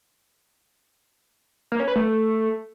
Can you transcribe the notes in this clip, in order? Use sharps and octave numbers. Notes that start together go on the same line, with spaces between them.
A#3
C#4
B4
A3